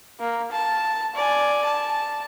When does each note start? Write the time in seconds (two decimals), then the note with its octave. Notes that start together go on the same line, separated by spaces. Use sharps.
0.20 A#3
0.52 A5
1.16 D5 G#5
1.65 A5